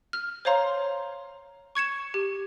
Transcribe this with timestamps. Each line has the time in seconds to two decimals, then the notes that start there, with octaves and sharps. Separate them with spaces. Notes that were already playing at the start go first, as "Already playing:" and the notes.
0.13 F6
0.45 C5 C#5 F5 A#5 C6
1.75 C#6 G#6 C#7 E7
2.14 G4